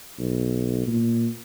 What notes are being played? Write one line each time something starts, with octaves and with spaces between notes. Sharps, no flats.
B1
A#2